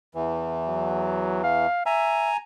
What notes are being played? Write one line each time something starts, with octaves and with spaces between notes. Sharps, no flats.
E2 E3
F#3
F5
E5 G#5 A#5